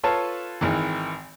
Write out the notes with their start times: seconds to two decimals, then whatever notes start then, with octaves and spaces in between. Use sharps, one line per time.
0.03 F4 A4 B4 C#5 F5 A5
0.61 G#1 D#3 E3